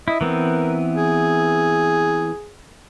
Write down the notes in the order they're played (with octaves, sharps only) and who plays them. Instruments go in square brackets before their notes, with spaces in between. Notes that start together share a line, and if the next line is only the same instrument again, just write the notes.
[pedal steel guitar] E4 [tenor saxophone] D#5
[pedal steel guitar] E3 B3 C4 [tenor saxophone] A#4
[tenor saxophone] G#4